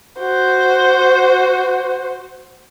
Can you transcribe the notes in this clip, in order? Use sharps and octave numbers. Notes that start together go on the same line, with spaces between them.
F#4 C5